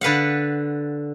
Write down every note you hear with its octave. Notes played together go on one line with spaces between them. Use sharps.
D3 B4 F5 F#5